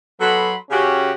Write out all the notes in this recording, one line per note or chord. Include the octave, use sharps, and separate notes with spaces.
F#3 B3 F#4 A4 B5 C6
C#3 C#4 F#4 G4